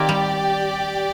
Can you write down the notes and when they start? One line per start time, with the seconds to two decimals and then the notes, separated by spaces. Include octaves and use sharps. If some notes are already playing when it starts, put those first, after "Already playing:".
Already playing: D#3 A#3 C4 G4 D5 G5
0.09 G3